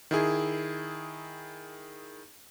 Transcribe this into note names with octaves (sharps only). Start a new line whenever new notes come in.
D#3 E4 G#4